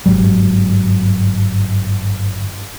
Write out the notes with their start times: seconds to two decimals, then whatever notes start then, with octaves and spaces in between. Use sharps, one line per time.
0.06 G1 G#2 F#3 G3